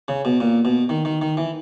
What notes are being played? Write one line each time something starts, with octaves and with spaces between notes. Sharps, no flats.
C#3
B2
A#2
B2
D#3
D#3
D#3
E3